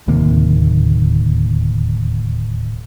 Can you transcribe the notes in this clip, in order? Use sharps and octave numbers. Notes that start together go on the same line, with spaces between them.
D1 D#2 C3 A#3